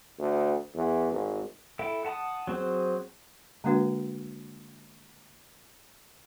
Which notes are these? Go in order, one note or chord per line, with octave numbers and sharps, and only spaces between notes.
D2
E2
G#1
E4 A4 E5 G5
F#5 A5 B5 D#6
F#3 C4 G#4 C5
D3 G#3 A#3 D4 F#4 B4